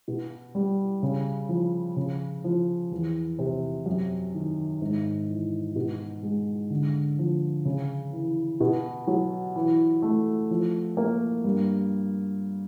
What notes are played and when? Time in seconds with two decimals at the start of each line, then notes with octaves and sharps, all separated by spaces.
0.08 B2
0.55 G3
1.03 C#3
1.49 F3
1.96 C#3
2.44 F3
2.91 E2
3.39 C3
3.86 F#2
4.34 D#3
4.82 G#2
5.29 E3
5.76 B2
6.23 G#3
6.70 D3
7.19 F3
7.65 C#3
8.13 E3
8.60 B2
9.07 F#3
9.56 E3
10.02 A3
10.51 F3
10.97 A#3
11.44 G2